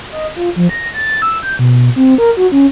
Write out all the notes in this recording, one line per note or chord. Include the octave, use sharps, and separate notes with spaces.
D#5
F4
F3
A#6
A6
E6
G6
B2
C4
A#4
F#4
C#4